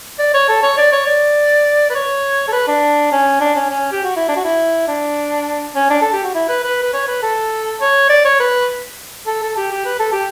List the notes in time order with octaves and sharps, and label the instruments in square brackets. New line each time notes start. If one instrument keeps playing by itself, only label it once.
[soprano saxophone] D5
C#5
A4
C#5
D5
C#5
D5
B4
C#5
A4
B4
D4
C#4
D4
C#4
C#4
G4
F#4
E4
D4
F#4
E4
D4
C#4
D4
A4
G4
F#4
E4
B4
B4
B4
C#5
B4
A4
C#5
D5
C#5
B4
A4
A4
G4
G4
B4
A4
G4